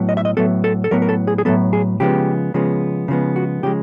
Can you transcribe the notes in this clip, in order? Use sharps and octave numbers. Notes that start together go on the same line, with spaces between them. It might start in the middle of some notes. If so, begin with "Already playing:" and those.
Already playing: A2 F#3 B3
D#5
E5
D#5
A2 F#3 B3 A4
A4
A4
A2 F#3 B3 A#4
A#4
A4
G#4
G#4
A2 F#3 B3 A4
G#4
C#3 F3 G#3 B3 G4
C#3 F3 G#3 B3
C#3 F3 G#3 B3
F#4
C#3 F3 G#3 G4